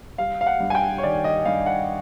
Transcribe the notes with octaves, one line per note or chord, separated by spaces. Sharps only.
G3 F5
F5
F#5
G2
G#5
G5
C#5
D#3 D5
D#5
G2 F5
F#5